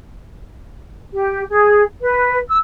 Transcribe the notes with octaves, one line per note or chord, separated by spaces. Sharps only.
G4
G#4
B4
E6